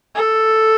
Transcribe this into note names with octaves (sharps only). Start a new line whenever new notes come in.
A4